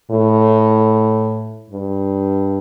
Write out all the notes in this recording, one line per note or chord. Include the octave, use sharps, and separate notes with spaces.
A2
G2